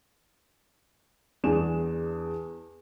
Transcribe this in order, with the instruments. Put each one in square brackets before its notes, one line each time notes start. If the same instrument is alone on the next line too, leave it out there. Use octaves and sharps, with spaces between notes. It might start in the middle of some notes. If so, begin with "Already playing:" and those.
[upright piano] E2 D4 G#4 E7